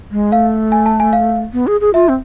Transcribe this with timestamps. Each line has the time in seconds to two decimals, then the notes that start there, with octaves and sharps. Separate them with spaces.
0.11 G#3
0.32 A3 F5
0.72 G#5
0.86 A5
1.00 G#5
1.13 F5
1.53 B3
1.67 G#4
1.81 G#4
1.94 F4 E5
2.09 C4